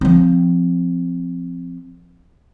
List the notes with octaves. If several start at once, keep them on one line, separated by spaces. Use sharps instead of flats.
F3 C4